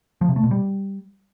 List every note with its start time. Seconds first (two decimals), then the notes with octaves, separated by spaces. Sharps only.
0.21 F3
0.29 C3
0.36 A3
0.44 B2
0.51 G3